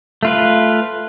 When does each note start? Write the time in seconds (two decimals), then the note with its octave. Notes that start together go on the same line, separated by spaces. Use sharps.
0.23 A3 F4 B4